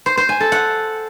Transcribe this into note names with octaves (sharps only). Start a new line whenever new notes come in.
C5
C5
G#5
A4
F#5